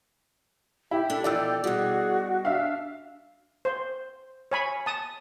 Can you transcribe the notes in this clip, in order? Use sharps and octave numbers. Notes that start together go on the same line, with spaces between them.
E4 G4
D4 A4
B2 E3 F3 D5 G5 E6
B2 G3 F#4 G#4
D4 E5 F5
C5
C#5 G#5 B5
A5 D#6